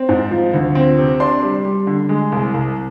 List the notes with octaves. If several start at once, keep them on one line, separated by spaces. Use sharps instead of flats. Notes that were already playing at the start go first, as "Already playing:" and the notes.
Already playing: C4
G#2
F3
D2
C4
C3
D4 C6
G3
G3
D3
G#3
C2
C2